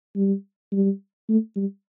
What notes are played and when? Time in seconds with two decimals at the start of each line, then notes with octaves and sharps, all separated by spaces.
0.16 G3
0.72 G3
1.29 A3
1.56 G3